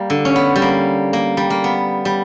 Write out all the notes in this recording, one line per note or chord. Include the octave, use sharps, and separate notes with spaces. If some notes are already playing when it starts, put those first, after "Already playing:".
Already playing: G3 A#3
D3
C#4
B3
G3
A#3
A#3
G3
A#3
B3
G3